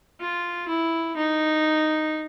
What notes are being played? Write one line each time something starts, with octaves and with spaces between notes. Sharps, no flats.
F4
E4
D#4